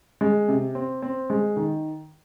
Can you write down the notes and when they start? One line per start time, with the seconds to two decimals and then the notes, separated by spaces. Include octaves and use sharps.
0.21 G#3
0.48 C3
0.75 C4
1.02 C4
1.30 G#3
1.56 D#3